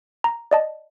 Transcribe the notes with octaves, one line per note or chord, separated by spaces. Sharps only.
A#5
D5 D#5 A5